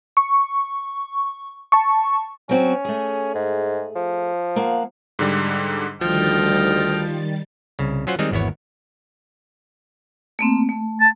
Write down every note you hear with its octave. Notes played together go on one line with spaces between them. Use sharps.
C#6
A5 C#6
F#3 C4 C#4 F#4
A3 G#4
G#2
F3
A#3 F5 F#5
G#2 D3 G3
D2 D#3 F3 G3 D#5 G5 F6 A6
C2 C#3
F#3 C#4 F4 C5 F#5
D#3 G3 G#3 C4 D#4
G#1 E2 B3 E4 C#5
A3 A#3 C4
A3
A5